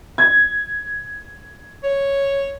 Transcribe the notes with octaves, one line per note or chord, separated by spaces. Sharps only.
G#6
C#5